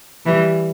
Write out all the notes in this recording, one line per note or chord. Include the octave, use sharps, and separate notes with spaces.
E3 G3